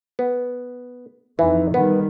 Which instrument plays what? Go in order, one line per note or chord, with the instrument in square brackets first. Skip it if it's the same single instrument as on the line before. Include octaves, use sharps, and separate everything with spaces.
[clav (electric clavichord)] B3
[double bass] F2 D#4 [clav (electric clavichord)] E3
[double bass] D#3 G3 [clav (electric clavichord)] B3